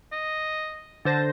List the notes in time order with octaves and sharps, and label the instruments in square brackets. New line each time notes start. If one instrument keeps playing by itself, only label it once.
[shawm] D#5
[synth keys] D3 C5 A#6 [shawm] A5